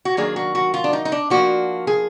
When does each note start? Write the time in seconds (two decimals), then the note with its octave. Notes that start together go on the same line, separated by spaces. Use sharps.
0.05 F#4
0.17 D#3 F#3 A#3 D4 G#4
0.36 F#4
0.55 F#4
0.74 F4
0.84 D4
0.93 D#4
1.05 D#4
1.12 D4
1.30 F3 A#3 D4 F#4
1.87 G#4